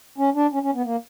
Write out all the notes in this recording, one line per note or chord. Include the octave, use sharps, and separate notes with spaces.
C#4
D4
C#4
C#4
B3
A#3